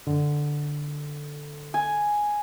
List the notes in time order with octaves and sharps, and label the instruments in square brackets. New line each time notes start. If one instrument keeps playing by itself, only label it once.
[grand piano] D3
[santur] G#5